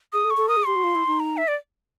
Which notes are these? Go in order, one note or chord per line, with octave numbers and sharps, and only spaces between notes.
G#4 D#6
A4
C#6
A4
A#4 D#6
G#4
G4 C6
F#4
F4
E4
D#4
A#5
E5
D5